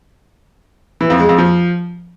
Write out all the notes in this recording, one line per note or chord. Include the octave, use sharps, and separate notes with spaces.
E3
F2
G#3
F2
F3